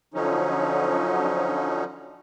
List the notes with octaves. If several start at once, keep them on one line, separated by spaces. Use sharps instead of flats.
D3 F3 F#3 C#4 D#4